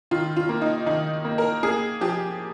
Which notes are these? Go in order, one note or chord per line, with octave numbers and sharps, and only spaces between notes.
D#3 F4
F4
A#3
D#4
D#3 D#4
A#3
A#4
A#3 G#4
F3 G4